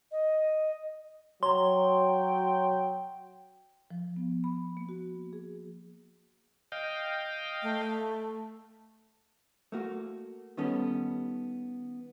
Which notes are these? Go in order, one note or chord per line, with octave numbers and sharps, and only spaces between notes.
D#5
F#3 C#5 G5 A#5 C6
F3
B3
B5
A#3
F#4
G#4
D#5 F5 G5
A3
A3 A#3 F#4
D#3 G3 B3 C#4 A4